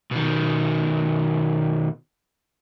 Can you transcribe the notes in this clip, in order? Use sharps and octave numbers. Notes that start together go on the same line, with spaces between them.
B2 D#3